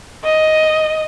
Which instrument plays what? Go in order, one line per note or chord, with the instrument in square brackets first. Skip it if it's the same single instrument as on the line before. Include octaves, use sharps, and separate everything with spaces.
[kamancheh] D#5